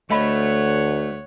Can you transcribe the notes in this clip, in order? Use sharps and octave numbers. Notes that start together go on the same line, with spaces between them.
D2 A3 C#5 D#5 F5 F#5 B5